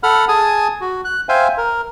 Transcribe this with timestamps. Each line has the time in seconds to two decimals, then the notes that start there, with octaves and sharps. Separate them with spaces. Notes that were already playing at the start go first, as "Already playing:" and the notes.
0.03 A4 F#5 B5 F6
0.29 G#4 G#5 A5 D#6
0.81 F#4
1.05 F#6
1.29 C5 E5 F5 G5 G#5
1.58 A#4